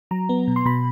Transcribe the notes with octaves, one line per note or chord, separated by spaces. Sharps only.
F#3 A#5
B3
B2
C6
B2 B5